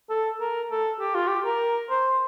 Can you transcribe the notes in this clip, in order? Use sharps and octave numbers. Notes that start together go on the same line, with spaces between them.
A4
A#4
A4
G4
F4
G4
A#4
C5